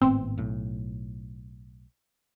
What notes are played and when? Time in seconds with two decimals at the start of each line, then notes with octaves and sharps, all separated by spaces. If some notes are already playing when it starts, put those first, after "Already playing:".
0.02 G#1 A2 B3 C4
0.38 B1 A2